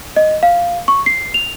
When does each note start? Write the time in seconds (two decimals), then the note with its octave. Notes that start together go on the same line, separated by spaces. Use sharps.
0.16 D#5
0.43 F5
0.88 C#6
1.06 C7
1.34 F7